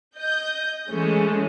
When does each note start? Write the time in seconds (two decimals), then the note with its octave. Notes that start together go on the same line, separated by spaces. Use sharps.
0.18 D#5 G6
0.90 E3 G#3 A3 C#4